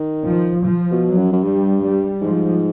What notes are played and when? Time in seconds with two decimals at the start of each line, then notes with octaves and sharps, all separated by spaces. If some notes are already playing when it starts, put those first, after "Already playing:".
Already playing: D#3
0.27 F3
0.65 F3
0.91 B2
1.05 F#3
1.18 F#2
1.33 F#2
1.43 G2 G3
1.82 G3
2.21 G#2 F3